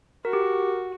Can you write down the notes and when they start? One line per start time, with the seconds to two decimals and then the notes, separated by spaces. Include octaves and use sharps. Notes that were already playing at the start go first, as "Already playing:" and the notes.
0.25 F#4 A#4
0.33 G4
0.42 A#4